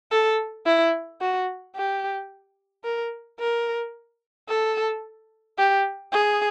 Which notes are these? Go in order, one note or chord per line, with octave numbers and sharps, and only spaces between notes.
A4
E4
F#4
G4
A#4
A#4
A4
G4
G#4